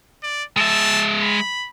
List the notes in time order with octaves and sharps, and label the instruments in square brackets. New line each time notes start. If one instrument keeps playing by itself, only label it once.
[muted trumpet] D5
[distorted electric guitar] G#3 E5 [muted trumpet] A5
[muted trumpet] B5